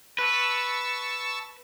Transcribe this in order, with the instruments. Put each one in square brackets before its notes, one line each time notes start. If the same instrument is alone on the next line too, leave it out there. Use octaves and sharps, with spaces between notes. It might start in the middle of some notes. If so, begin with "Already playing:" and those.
[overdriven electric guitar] B4 [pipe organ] A5 C#6 E6